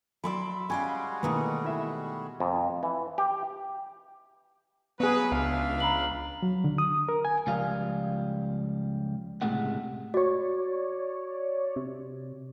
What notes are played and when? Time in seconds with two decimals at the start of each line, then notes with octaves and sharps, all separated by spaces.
0.24 F#3 E4 D5 B5 C6 E6
0.70 G3 G#3 C#4 F#4 G4 F5 G#5
1.23 B2 D#3 E3 A3 A#3 D#6
1.64 E4 E5
2.40 F2
2.83 E3
3.18 G4
5.00 F#3 B3 G#4 B4
5.32 C#2 D4 E5 F5
5.80 A#5 B5 F#7
6.42 F#3
6.64 D3
6.78 D#6
7.09 A#4
7.25 G#5
7.47 C#2 F3 G3 F5
9.42 C#2 A2 C3 G#3 A3 F#5
10.14 F#4 C#5 D5
11.76 C3